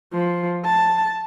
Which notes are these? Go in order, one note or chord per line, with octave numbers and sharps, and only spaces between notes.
F3
A5